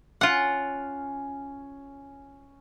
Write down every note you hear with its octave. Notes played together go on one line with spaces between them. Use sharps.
C#4 F4 F#5